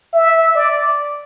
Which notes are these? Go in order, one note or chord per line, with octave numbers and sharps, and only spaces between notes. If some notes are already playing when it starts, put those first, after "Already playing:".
E5
D5